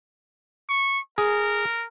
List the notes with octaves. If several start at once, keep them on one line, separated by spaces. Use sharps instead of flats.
C#6
G#4 A#4